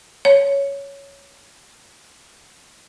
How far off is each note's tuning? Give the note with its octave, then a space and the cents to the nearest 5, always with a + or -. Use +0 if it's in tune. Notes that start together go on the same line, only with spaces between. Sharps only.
C#5 +5